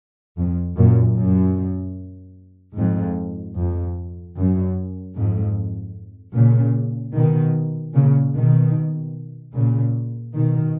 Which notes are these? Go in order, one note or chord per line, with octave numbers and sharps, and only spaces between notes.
F2
F#2 A#2
F#2
F2 G#2
F2
F#2
F2 G#2
A#2 C#3
B2 D#3
A#2 C#3
B2 D#3
A#2 C#3
B2 D#3